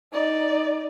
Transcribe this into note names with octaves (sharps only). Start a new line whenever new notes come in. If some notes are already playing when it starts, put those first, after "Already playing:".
D#4 D5